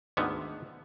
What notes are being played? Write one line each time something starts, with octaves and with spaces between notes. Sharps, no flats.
D2 G#2 D3 D#3 B3